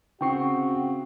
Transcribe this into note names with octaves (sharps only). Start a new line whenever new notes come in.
C#3 C4 F#4 G5 C#6 C7